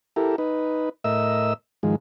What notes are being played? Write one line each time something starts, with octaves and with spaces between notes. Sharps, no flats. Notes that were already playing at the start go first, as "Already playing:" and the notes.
E4 G4 A4 A#4
D#4 B4
A2 A#4 D#5 E5 E6
G#2 D#3 F3 G#3